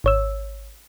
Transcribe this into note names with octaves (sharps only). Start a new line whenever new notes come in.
G#1 C#5 E6